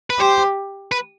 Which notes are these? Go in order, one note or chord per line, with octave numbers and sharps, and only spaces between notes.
B4
G4 C5
B4